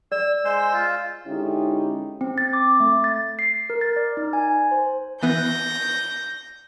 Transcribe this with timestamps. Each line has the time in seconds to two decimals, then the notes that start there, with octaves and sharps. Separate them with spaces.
0.12 D5 E6
0.45 G#3 C5 E6
0.73 F4
1.27 D3 G#3 C#4 D#4 E4 G4
2.21 C4
2.38 A6
2.53 D6
2.80 A3
3.04 A6
3.39 C7
3.70 A#4
3.81 A6
3.96 D5
4.17 D#4
4.33 G#5
4.71 C5
5.23 E3 B3 G6 A#6